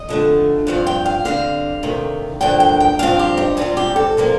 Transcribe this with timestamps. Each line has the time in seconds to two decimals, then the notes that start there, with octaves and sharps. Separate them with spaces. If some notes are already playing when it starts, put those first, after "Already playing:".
Already playing: D#5
0.09 F2 D3 A3
0.67 G2 F3 C4 F5
0.87 G5
1.06 F5
1.25 D3 G3 C4 F5
1.83 C3 D#3 A3
2.41 G2 D3 F3 A#3 G5
2.60 G5
2.80 G5
2.99 G2 F3 C4 F5
3.19 G4
3.37 D#4
3.57 C3 G3 C4 F4
3.77 G4
3.96 A4
4.17 C3 F3 A#3